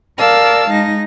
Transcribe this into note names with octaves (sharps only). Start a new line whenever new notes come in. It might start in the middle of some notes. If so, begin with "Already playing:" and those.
A#4 D5 F5 A5 E6
G#3 D#4 A#6